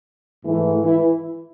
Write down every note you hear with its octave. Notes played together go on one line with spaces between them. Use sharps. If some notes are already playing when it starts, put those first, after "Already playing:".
G#2 E3 A3
E3 E4